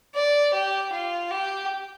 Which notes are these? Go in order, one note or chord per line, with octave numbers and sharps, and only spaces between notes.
D5
G4
F4
G4